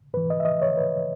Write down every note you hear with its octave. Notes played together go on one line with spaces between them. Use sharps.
G#2 E3 B4
D#5
E5
D#5
C#5
B4